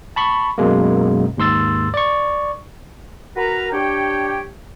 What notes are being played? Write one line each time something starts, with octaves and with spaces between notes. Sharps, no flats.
A5 B5 C#6
F#2 B2 G#3 A#3
D#2 G#2 C6 E6 A6
D5 C#6
F#4 A#4 B4 A#5
D4 G4 C#5 G5